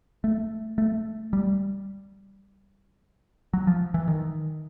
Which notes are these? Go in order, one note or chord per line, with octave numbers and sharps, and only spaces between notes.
A3
A3
G3
F#3
F3
E3
D#3